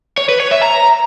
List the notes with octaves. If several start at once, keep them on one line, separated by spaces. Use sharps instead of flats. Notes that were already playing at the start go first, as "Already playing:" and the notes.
C#5
B4
C#5
E5
A#5